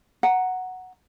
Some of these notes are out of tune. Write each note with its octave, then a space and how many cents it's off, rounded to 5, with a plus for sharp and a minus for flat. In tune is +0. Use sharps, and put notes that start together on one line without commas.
F#5 +0 A#5 +0